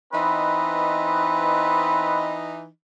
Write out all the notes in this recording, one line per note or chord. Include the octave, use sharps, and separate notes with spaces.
E3 B3 C4 D#4 B4 D#5